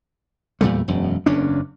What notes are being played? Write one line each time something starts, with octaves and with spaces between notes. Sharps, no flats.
E2 A#2 G3 A3
E1 F#2
F#1 E2 C#4 D4